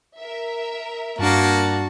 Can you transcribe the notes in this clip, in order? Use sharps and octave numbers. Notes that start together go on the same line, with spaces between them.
A#4 E5
G2 A#3 D4 F#4 A5